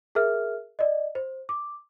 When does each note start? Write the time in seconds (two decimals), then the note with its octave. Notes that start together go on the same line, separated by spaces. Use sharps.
0.15 G#4 A#4 E5 F6
0.79 D5 D#5
1.15 C5
1.49 D6